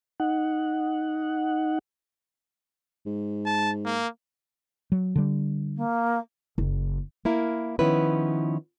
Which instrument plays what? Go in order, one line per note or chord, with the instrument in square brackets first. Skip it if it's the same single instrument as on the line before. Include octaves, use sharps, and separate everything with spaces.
[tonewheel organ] D#4 F#5
[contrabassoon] G#2
[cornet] A5
A#3
[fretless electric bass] F#3
D3 G3
[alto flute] A#3
[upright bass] F#1
[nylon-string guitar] A#3 E4 A#4
D#3 F3 B3 C#4 E4 B4